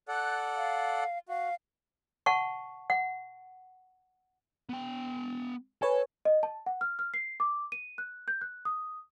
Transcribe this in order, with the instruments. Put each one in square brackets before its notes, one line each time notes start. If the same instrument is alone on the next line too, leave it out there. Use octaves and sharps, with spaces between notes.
[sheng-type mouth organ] A4 D5 F#5 [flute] F#6
[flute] F5
[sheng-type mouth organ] F#4 [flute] F5
[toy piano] F#5 A5 C#6
F#5
[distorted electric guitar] B3 G5
[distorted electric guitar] A4 [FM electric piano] B4 C#5 G#5
[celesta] D#5
A5
F#5
F6
F6
C7
D6
D#7
F#6
G6
F#6
D#6